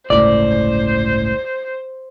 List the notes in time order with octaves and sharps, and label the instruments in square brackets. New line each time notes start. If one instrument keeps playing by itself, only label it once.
[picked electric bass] G1 C#2 A2 [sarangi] C5 [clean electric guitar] D5